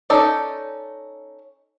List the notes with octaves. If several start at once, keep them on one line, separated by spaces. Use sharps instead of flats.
C#4 D#4 A4 D5